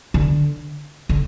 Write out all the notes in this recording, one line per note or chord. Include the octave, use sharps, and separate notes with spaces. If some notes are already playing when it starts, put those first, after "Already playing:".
D3
D3